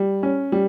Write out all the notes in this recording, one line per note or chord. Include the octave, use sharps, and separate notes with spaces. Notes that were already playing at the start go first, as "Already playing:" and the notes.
Already playing: G3
C#4
G3